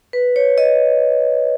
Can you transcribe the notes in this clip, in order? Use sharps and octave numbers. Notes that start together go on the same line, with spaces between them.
B4
C#5
D#5